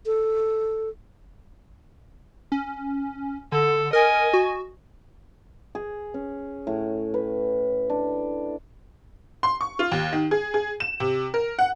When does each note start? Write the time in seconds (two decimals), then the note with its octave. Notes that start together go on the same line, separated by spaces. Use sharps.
0.06 A4
2.52 C#4
3.52 D3 A4
3.93 A#4 D#5 G#5
4.33 F#4
5.75 G#4
6.14 C#4
6.67 A2
7.14 B4
7.90 D4
9.43 C6
9.61 C#6
9.79 F4
9.92 D#2
10.13 D#3
10.31 G#4
10.54 G#4
10.80 E7
11.00 C3
11.34 A#4
11.59 F#5